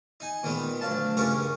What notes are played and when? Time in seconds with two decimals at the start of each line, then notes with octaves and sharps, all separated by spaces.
0.20 D#4 G#5
0.43 A#2 D#3 G#3 B3
0.81 D2 F#3 F5 A5
1.17 C#2 G2 C#4 A#4 C#6 D6